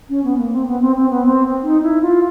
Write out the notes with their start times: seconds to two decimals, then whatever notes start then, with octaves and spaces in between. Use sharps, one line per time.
0.09 C#4
0.24 B3
0.38 A#3
0.52 C4
0.67 B3
0.81 C4
0.96 C4
1.10 B3
1.25 C4
1.63 D#4
1.82 E4
2.02 F4